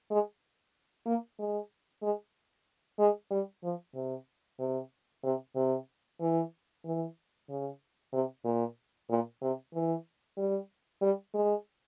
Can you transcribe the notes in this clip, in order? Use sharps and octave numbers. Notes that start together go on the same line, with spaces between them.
G#3
A#3
G#3
G#3
G#3
G3
F3
C3
C3
C3
C3
E3
E3
C#3
C3
A#2
A#2
C3
E3
G3
G3
G#3